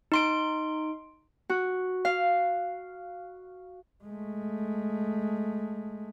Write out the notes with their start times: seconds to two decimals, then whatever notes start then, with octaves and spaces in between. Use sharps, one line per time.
0.12 D#4 C6 D7
1.50 F#4
2.05 F5
4.04 G#3 A3